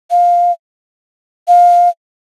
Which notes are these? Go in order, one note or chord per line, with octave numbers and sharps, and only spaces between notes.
F5
F5